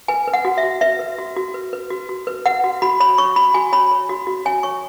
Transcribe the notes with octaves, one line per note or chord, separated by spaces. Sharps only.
B4 G#5
B4
F#5
F#4
E5
F#4
B4 E5
B4
F#4
F#4
B4
B4
F#4
F#4
B4
B4 F#5
F#4
F#4 B5
C#5 B5
C#5 C#6
F#4 B5
F#4 G#5
C#5 B5
C#5
F#4
F#4
C#5 G#5
C#5 C#6